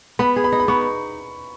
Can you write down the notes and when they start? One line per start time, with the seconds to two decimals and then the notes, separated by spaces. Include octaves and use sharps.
0.19 B3 B5
0.36 G#4
0.44 B5
0.52 D#4
0.60 B5
0.68 B3 C#6